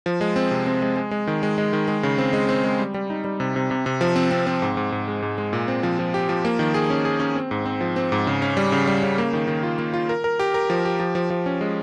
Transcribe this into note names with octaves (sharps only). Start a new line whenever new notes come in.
F3
G#3
C4
C3
C4
G#3
G#3
G#3
D#3
G#3
G#3
D#3
G#3
C#3
C4
G#3
C4
G#3
G3
G3
D#4
G3
C3
C3
C3
C3
F3
C4
C4
C4
G#2
G#2
G#2
G#3
G#2
G#3
A#2
C4
F3
F3
G4
F3
A#3
D#3
G#4
C#4
G#4
C#4
C4
G#2
C4
F3
C4
G#2
C#3
C#4
G3
C#3
G3
C#3
A#3
D#3
D#3
F4
A#3
F4
A#4
A#4
G4
A#4
F3
G4
F3
F3
F3
C#4
G#3